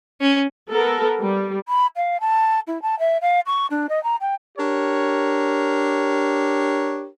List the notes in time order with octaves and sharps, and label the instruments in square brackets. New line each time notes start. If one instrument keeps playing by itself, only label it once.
[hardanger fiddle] C#4
[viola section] B3 A4 A#4
G3
[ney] B5
F5
A5
E4
A5
E5
F5
C#6
D4
D#5
A#5
G5
[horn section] D4 G4 A#4 C#5